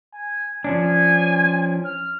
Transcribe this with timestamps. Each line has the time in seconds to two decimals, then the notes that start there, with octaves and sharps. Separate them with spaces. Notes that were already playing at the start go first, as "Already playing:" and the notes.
0.14 G#5
0.64 F3 C#4 D4 G#5
1.85 F6